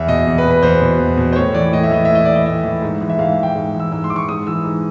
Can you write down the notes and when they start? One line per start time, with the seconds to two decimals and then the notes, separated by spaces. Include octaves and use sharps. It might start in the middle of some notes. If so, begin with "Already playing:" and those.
Already playing: E2 E5
0.08 B2 D#5
0.27 E2
0.38 B4
0.45 B2
0.51 B4
0.63 E2 C5
0.81 B2
0.99 E2
1.17 B2
1.33 C5
1.36 A2 C#5
1.54 E3 D5
1.72 A2 D#5
1.83 E5
1.91 E3 D#5
2.05 A2 E5
2.15 D#5
2.25 E3 D5
2.35 D#5
2.46 A2 E5
2.64 E3
2.82 G#2
3.01 E3
3.10 E5
3.19 G#2 F5
3.38 E3
3.43 G5
3.56 G#2
3.74 E3
3.80 E6
3.91 G#2 E6
4.04 C6
4.10 E3 D6
4.16 C#6
4.29 G#2 D#6
4.47 E3 E6
4.65 G#2